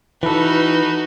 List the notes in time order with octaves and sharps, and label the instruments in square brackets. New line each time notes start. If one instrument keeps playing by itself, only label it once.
[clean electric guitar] E3 A4 [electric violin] D#4 F#4 [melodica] B4